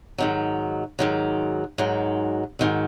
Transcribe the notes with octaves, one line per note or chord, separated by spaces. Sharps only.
G#2 D#3 F#3
G#2 D#3 F#3
G#2 D#3 F#3
G#2 D#3 F#3